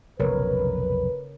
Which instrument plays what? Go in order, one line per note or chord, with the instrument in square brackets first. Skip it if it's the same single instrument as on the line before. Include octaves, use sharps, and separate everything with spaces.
[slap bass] F1 B1 [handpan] C#3 A#4 C#5 [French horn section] B4